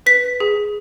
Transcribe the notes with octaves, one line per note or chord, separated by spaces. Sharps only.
B4 B6
G#4